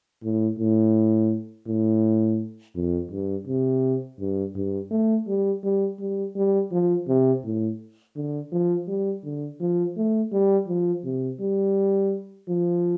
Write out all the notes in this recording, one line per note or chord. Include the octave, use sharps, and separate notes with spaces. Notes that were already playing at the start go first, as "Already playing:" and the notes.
A2
A2
A2
F2
G2
C3
G2
G2
A3
G3
G3
G3
G3
F3
C3
A2
D3
F3
G3
D3
F3
A3
G3
F3
C3
G3
F3